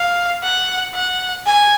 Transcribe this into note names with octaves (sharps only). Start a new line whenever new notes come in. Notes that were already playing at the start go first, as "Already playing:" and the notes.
Already playing: F5
F#5
F#5
G#5